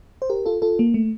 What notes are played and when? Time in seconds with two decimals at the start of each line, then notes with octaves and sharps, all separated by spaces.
0.22 C5
0.30 G4 A#4
0.46 F4 A4
0.62 F4 A4
0.79 A#3
0.94 A3